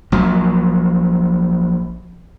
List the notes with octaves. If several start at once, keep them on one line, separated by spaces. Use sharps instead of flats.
A#1 F3 F#3